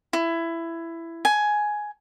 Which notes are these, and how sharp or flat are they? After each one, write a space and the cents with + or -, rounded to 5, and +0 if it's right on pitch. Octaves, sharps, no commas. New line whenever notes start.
E4 +15
G#5 +10